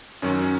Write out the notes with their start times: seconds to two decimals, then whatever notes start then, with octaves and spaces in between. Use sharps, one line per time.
0.22 F#2 D#3 F#3 C#4
0.42 C#4